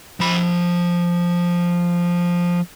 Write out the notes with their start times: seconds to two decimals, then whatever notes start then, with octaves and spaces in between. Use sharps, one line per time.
0.20 F3 B5